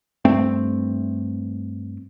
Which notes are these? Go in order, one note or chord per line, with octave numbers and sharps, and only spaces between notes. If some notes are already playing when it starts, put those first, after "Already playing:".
G2 A3 C4